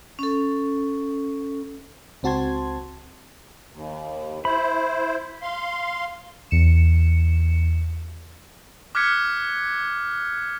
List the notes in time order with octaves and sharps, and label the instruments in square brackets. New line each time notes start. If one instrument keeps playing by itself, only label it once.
[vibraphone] C#4 A4
[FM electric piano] C#2 C4 F#4 A5 C6 G#6
[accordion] D#2
[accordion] E4 C5 [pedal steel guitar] B5
[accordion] F5 C6
[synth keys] E2 C#7 E7
[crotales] D6 F6 F#6 G#6 B6 C#7